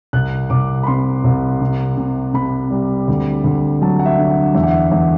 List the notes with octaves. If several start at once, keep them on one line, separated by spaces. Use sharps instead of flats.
C2 F#6
C2 D6
B5
C3 C6
C2
C3
C3
C3 B5
G3
D2
D2
F#3 A5
F#5
E5
D3
F#5
E2 E5
F#5
E5
E2 F#5